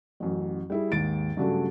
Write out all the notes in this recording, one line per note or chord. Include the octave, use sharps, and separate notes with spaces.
A1 F#2
G3 E4 G#4
D#2 G#2 A6 D7
G2 C#3 F#3 A3 D4